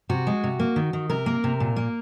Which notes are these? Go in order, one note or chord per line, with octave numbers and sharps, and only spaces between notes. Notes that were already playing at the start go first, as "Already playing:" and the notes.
C3 F#4
G#3
C3
A#3
D#3
D#3
C3 A#4
A#3
C3
A#2
A#3